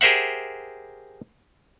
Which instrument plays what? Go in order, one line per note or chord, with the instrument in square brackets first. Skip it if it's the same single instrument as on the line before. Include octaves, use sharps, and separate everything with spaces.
[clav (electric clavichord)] G4 G#4 A#4 C5 E5 F#5